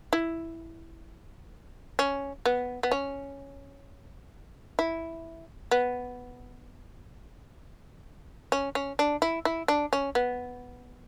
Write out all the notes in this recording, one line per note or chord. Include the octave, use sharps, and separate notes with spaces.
E4
C#4
B3
B3
C#4
E4
B3
C#4
C#4
D4
E4
E4
D4
C#4
B3